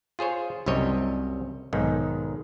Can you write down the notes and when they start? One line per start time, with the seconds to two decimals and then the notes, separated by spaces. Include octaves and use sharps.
0.19 F4 G#4 C5 C#5
0.66 C2 F#2 C3 G3 C#5 D#5
1.73 B1 G#2 D#3